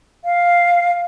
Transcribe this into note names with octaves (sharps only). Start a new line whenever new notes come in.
F5